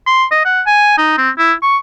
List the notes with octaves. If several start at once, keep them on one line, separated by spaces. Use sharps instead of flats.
C6
D#5
F#5
G#5
D#4
C4
E4
C#6